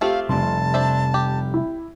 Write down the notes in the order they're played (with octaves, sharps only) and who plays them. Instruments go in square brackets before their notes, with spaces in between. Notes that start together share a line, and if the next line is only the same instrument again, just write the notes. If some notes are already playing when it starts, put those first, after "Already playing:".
[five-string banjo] A3 C4 F4 [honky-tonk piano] G4 [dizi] F5
[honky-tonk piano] F1 C6 [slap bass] C3 F3 G3 [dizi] A5
[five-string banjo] D4 C5 E5
G4
[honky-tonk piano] E4